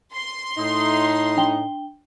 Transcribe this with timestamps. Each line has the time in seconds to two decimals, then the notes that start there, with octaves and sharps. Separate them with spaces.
0.13 C6
0.57 A2 D#4
1.37 D4 G5 G7